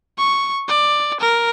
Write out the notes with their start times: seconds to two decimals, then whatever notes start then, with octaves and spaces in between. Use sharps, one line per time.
0.18 C#6
0.69 D5
1.20 A#4